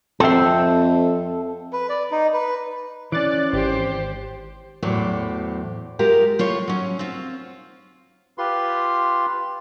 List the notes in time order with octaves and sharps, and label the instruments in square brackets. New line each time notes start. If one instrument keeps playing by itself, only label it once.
[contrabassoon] F2 [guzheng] C4 C6 [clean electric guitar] A4 E5
[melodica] B4
D5
D#4
B4
[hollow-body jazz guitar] E3 C#4 [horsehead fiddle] D5 [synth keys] D6 F#6 A6
[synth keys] G#1 [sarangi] G4 [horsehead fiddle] C5
[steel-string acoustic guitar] E2 A2 F#3 G4 C5 G5
G#3 F4 G4 A#4
A2 F4 C#5
F#3 C#4
C4 F4
[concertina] F4 G4 B4 C6